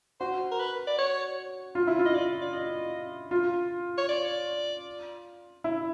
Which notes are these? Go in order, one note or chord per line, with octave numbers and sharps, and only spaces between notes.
F#4 C5
A#4
B4
D5
C#5
F4
E4
F4
D#5
D5
D5
D#5
F4
C#5
D5
E4